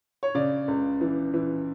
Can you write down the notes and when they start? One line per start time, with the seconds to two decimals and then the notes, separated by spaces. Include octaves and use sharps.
0.23 C#5
0.35 C#3 D5
0.68 C#2
1.01 E3
1.34 E3